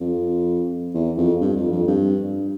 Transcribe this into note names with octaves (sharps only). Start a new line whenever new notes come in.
F2
E2
F2
G2
F2
F2
G2